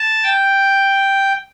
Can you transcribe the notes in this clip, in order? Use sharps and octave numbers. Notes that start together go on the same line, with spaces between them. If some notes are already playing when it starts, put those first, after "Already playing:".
Already playing: A5
G5